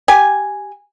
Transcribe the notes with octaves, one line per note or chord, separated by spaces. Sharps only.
G4 G#5